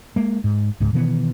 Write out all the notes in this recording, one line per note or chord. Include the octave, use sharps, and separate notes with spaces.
G#3 A#3
G#2
C#2 G#2
B2 D#3 E3 B3